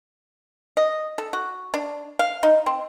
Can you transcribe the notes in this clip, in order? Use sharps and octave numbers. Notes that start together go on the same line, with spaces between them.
D#5
A4
F#4
D4
F5
D#4
C4